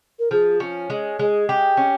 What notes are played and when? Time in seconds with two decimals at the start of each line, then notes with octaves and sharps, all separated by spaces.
0.19 A#4
0.31 F3 G#4
0.60 C#4
0.90 G#3
1.19 G#3 G#4
1.49 G4
1.77 C#4